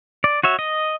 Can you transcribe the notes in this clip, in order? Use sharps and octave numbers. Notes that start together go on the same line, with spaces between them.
D5
F#4 C#5 E5
D#5